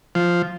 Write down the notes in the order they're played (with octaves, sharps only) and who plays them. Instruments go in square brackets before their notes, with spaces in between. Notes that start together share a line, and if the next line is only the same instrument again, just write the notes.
[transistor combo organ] F3